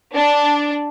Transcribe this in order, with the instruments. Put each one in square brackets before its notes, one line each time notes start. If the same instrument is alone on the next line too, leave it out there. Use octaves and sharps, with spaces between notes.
[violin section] D4